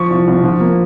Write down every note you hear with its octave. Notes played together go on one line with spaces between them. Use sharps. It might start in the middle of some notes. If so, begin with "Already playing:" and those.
Already playing: F3 C#6
C2
C2
F3
A#3